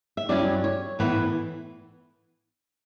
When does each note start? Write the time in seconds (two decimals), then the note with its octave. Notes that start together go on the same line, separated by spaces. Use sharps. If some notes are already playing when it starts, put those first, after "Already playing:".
0.17 E5
0.29 G2 F#3 C#4 E4 D5
0.64 C#5
0.99 A2 E3 B3 E4 B4